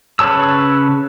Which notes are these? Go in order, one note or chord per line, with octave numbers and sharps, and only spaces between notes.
C#3 B4 C#5 A5 E6